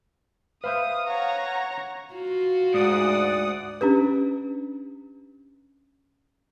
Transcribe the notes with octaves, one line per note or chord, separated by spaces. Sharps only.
B4 C5 E5 F5 D#6
C#5 F#5 A#5
F4 F#4
D2 G#2 D5 F#5 D#6
C#4 D4 G4 B4